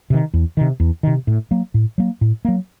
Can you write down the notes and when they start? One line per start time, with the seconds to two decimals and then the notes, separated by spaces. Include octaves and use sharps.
0.10 C3 D#3
0.33 E2
0.57 C3 D#3
0.80 E2
1.03 C3 D#3
1.27 A2
1.51 F#3 A#3
1.74 A2
1.98 F#3 A#3
2.21 A2
2.45 F#3 A#3